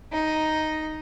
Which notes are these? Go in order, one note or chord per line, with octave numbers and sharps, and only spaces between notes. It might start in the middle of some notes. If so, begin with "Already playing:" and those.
D#4